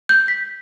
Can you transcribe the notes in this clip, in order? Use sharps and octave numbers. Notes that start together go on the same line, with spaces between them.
G6
B6